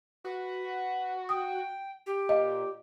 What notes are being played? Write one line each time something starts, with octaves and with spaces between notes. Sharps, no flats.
F#4 B4
G5 D#6
G4
A#2 D#5 F5